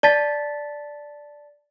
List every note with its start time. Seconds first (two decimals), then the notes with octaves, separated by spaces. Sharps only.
0.03 D5 A5 A6 B6